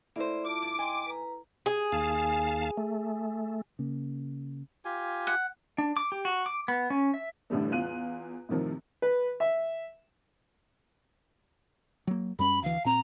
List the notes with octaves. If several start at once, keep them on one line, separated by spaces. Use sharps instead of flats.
A3 A#3 E4 C5 D5
F4 A5 D6
G2
G#2 D#5 G5 G#5 C6
B4 A#5
G#4
D#2 F5 A5
A3
C#3 A#3
F4 G4 G#5
F#5
D4
D6
G4
F#4
D6
B3
C#4
E5
A1 A2 D3 G3 A3
E2 F4 F#6 D#7
A2 C3 D#3 F3
B4
E5
F#3 A#3
F#2 G3 C#4 B5
D2 E3 F5
A#2 C4 A#5